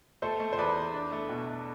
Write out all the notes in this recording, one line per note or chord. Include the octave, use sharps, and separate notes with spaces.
A3 A4 C5
A3
C5
E2 B4 D5
E2
D4
A3
B2
A3